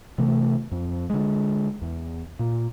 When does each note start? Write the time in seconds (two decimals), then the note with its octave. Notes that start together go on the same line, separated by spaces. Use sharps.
0.18 C3 E3 A3
0.72 F2
1.10 D3 G#3
1.82 E2
2.39 A#2